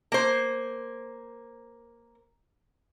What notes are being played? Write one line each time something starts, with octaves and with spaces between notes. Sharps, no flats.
A#3 C5